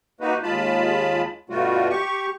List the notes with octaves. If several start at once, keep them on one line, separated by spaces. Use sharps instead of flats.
A#3 D#4 F#4 B4
D#2 G#3 F4 A5 B5
G2 B2 G3 A3 F4 F#4
G4 C#6